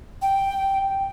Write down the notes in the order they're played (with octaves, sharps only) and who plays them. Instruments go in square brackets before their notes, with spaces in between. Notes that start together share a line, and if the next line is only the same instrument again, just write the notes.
[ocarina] G5